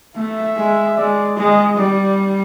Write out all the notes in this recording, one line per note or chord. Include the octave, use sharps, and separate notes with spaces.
A3 E5
G#3
G#3 D5
G#3 D#5
G3 D5